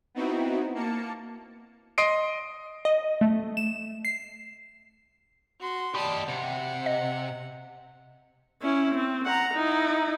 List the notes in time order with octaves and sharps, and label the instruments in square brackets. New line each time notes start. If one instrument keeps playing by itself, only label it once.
[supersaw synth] B3 C4 D#4 E4 F#4
A#3 A5 C#7
[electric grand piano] D#5 C6 D#6 C7 D7
[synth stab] D#5
A3
E7
C7
[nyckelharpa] F#4 C6
[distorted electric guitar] G4 D#5 [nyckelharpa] D5 A5 [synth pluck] B5
[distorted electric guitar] C3 [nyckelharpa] F#5
[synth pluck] D#5
[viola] C#4 E4
C4
F#5 A#5
D#4 E4